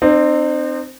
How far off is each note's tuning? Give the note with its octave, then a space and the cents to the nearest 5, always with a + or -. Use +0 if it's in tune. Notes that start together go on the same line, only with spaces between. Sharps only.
C4 +0 D#4 -45